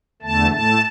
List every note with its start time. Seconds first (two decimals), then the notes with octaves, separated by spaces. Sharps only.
0.22 E2 D3 A3 A5
0.51 A2 A3 A5